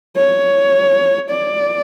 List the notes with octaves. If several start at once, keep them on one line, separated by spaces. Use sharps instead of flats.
C#5
D5